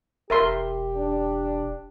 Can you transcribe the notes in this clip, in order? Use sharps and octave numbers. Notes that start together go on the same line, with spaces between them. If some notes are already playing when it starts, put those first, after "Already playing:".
E1 G4 A#4 E5 C6
D4